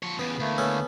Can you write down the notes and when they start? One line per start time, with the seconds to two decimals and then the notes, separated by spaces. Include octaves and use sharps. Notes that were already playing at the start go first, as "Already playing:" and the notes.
0.03 F3 C#5
0.19 E2 C#3 B3 G5
0.40 D2 A3 A#3 E4
0.58 B3 C#4 A4